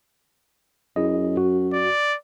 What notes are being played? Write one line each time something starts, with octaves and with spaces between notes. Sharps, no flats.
F#2 E4 G#4 D#5
F#4
D5